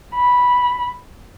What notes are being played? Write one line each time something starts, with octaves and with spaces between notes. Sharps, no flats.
B5